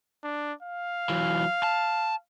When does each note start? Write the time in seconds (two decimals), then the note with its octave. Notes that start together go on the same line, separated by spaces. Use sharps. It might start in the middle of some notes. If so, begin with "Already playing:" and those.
0.24 D4
0.63 F5
1.10 E3 F#3
1.63 A5